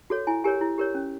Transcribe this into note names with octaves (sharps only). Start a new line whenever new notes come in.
F#4 A4 C#5
E4 G#5
G4 A#4 C#5 G#5
E4
G4 A#4 C#5
C#4